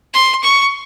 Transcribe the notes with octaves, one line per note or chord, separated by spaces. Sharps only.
C6
C#6